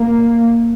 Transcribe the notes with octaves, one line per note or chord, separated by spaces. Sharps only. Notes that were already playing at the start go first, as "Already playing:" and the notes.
Already playing: A#3